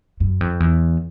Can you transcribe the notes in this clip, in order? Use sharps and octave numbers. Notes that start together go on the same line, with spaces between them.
F#2
F2
E2